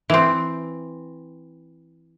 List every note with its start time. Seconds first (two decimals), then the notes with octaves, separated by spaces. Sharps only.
0.10 E3 C4